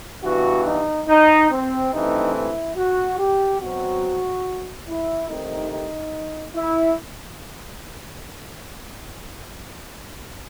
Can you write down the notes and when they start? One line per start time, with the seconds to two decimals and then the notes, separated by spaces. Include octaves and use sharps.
0.23 G2 E3 B3 F#4
0.66 D#4
1.07 D#4
1.51 C4
1.92 G2 E3 A3 C4 D#4
2.34 E4
2.76 F#4
3.18 G4
3.60 B2 F#3 C4 F#4
4.88 E4
5.29 C2 C3 D#3 A3 D#4
5.71 D#4
6.55 E4